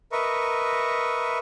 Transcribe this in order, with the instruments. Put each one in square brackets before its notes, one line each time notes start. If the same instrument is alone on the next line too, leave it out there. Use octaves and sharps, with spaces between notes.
[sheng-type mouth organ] A#4 B4 D#5 E5 C#6